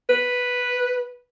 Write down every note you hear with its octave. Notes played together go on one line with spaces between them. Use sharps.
B4